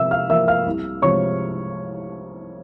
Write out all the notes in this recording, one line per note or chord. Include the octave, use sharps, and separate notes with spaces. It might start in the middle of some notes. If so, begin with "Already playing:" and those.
Already playing: C3 F3 A#3 E5 E6
F5 F6
F3 A#3 E5 E6
F5 F6
C2
C3 F3 G#3 C#5 C#6